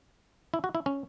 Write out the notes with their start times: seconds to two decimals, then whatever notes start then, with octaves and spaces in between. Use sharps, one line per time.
0.54 E4
0.64 F#4
0.75 E4
0.86 C#4